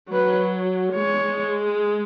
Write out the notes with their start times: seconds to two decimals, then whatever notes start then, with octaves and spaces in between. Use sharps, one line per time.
0.13 F#3 B4
0.95 G#3 C#5